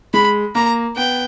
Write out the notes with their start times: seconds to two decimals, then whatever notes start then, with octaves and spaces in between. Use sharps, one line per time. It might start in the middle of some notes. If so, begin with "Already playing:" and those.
0.14 G#3 B5
0.55 A#3 A#5
0.96 B3 G5